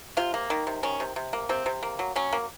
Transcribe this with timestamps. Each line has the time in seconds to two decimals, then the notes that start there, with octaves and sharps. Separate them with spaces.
0.17 C3 F4
0.34 A#3
0.50 D#3
0.67 C3
0.83 D#3 C#4
1.00 C3
1.16 C3
1.33 A#3
1.49 C3 C4
1.66 C3
1.83 A#3
1.99 F#3
2.16 F#3 C#4
2.33 A#3